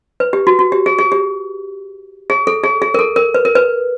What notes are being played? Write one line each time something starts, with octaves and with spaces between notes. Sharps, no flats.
B4
G4
F#4
F#4
G4
G#4
G#4
G4
G#4
A4
G#4
G#4
A#4
A4
A#4
B4
A#4
B4